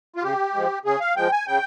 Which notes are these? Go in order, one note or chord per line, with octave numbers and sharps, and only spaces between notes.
F4
C#3 G4
F3 G#3
C#3 G#4
F5
F3 G#3 G5
G#5
C#3 G5